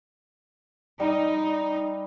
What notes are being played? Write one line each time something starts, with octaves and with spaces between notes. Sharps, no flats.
G3 D#4